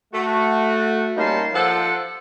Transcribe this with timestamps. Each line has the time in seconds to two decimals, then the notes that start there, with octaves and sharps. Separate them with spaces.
0.14 A3 F#4
1.17 G3 A#3 C#4 D#4 A5 C6
1.54 F3 F4 A4 F#5